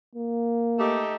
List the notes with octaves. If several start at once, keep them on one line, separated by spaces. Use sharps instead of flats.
A#3
A3 D#4 G4